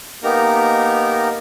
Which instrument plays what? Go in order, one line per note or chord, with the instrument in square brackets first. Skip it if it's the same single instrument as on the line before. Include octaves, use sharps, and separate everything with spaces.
[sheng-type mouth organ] A#3 B3 D#4 G4 A#4 A#5